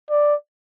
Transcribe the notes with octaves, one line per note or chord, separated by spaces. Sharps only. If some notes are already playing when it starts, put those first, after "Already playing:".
D5